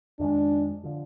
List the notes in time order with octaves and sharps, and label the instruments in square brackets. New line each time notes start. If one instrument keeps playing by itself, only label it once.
[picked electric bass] F2 D#3 G#3 [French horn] D4
[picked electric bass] D3 F3